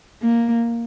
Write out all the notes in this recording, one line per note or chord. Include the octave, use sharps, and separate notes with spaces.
A#3